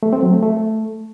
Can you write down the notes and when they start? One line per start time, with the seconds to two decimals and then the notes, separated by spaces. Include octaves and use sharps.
0.03 A3
0.13 C4
0.23 F#3
0.33 A3
0.43 A3